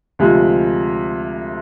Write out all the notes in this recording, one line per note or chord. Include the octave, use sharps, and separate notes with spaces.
D2 C3 F3 G#3